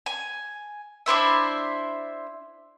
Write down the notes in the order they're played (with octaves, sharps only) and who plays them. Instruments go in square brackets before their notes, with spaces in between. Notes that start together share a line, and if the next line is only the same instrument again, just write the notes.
[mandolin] G#5
D4 E4 C5 E5